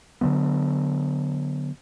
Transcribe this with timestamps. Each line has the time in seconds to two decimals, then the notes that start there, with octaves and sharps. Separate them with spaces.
0.21 D3 D#3 F#3 B3